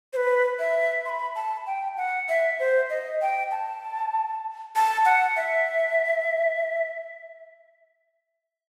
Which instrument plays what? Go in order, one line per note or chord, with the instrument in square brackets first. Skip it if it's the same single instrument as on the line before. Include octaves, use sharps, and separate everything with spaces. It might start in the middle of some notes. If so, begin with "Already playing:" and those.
[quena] C5
B4
E5
C6
B5
A5
G5
F#5
E5
C5
D#5
G5
A5
A5
F#5
E5